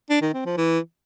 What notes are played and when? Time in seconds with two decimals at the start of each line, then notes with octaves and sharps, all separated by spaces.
0.10 D4
0.22 D#3
0.33 C4
0.45 F3
0.57 E3